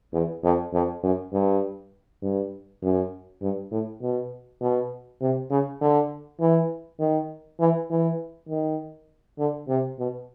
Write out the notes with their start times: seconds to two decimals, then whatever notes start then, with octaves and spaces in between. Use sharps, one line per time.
0.13 E2
0.43 F2
0.73 F2
1.03 F#2
1.33 G2
2.22 G2
2.83 F#2
3.41 G2
3.71 A2
4.02 B2
4.61 B2
5.21 C3
5.50 C#3
5.81 D3
6.40 E3
7.00 D#3
7.59 E3
7.90 E3
8.49 D#3
9.39 D3
9.68 C3
9.99 B2